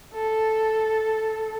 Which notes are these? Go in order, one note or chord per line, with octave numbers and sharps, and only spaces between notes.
A4